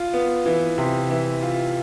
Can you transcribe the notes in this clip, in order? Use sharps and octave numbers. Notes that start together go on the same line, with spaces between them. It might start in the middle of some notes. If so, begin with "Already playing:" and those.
Already playing: F4
B3
E3
C3
E3
F4